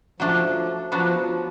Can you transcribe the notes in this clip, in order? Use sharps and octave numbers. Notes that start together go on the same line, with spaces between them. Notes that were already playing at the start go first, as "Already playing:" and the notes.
F3 F#3 A3 D4
F3 F#3 B3 D4 F#4